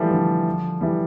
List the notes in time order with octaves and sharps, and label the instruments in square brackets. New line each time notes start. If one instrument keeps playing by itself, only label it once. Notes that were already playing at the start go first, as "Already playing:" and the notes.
Already playing: [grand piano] E3 F3 G3 A3
D3 F3
E3 G3